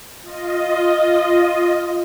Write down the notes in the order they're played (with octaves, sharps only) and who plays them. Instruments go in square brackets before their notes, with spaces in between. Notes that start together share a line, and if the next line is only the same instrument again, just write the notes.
[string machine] F4 D#5